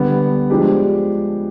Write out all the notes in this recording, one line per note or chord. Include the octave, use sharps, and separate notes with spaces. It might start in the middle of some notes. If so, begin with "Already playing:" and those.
Already playing: D3 G3 B3
F3 G#3 D4 G4